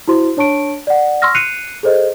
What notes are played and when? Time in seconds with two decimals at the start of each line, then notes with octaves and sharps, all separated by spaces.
0.08 E4 F#4 C5 C6
0.37 D4 C#5 A5 C#6 D7
0.87 D5 F#5
1.22 C6 C#6 E6 F6 A#6
1.35 F#6 C7 C#7 D#7 F7
1.83 G#4 A4 C5 D#5